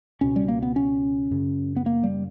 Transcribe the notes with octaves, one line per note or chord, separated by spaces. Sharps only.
C#2 B2 C#4
G3
A#3
B3
C#4
F#2 C#3
B3
A#3
G3